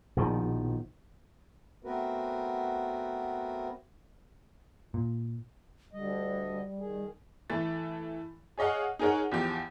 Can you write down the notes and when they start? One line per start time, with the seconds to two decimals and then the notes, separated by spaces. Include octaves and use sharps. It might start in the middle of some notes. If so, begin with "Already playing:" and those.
0.17 A#1 B2 D#3 F3
1.85 A3 B3 C4 F#4 A#4 B4
4.94 A#2
5.93 D2 D3 G3 D#5
6.78 D#3 G#4
7.50 E3 A3 A6
8.58 G#4 C#5 D#5 F5 F#5
8.99 D#4 G#4 A#4 C#5 F#5
9.32 E2 F3 G4